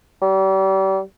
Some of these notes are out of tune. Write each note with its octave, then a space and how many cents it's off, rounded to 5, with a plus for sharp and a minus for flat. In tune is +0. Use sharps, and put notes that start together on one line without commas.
G3 -35